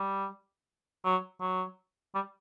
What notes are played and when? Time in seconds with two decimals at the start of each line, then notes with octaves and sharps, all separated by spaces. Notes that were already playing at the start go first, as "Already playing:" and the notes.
Already playing: G3
1.05 F#3
1.41 F#3
2.14 G3